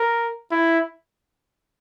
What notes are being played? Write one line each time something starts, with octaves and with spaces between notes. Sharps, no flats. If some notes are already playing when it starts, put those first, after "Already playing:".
Already playing: A#4
E4